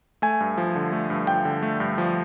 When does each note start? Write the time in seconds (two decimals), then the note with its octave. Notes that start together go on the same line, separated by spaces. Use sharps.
0.22 A3 G#5
0.40 G2
0.58 F3
0.76 D3
0.93 A3
1.10 G2
1.27 F3 G5
1.45 D3
1.62 A3
1.80 G2
1.98 F3